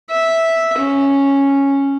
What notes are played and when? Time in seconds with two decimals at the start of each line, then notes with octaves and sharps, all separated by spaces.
0.10 E5
0.78 C#4